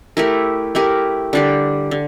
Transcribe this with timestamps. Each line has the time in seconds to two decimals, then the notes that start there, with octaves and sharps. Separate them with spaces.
0.17 A3 E4 G4 A#4
0.75 A3 E4 G4 A#4
1.33 D3 G3 D4 G4
1.91 D3